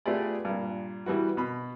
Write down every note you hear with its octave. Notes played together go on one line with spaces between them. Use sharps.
A3 B3 F4 G4 G#4 D5
G2 A#2
E3 G3 B3 F#4
B2 B5